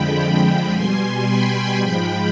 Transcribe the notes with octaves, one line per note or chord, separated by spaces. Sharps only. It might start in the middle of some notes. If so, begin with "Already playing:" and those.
Already playing: F2 D3 F3 G#3 G5 B5
B2 G3 G#5 C6
G5 B5
G#2 F3 G#3